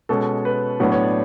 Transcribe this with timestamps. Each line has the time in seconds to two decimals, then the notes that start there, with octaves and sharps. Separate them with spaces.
0.09 B2 G#3 C#4 A4
0.45 B4
0.80 A2 F#3 B3 D4 C#5
0.92 C#5
1.03 D5